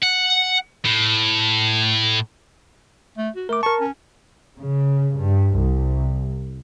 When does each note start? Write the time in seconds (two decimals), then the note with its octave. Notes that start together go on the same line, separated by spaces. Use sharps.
0.03 F#5
0.85 A2
3.18 A3
3.36 F#4
3.49 A3 A#4 D6
3.63 A#4 A5 C#6
3.80 C#4
4.59 C#3
5.18 G2
5.58 C2